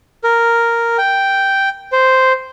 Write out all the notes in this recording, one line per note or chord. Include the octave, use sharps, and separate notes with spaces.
A#4
G5
C5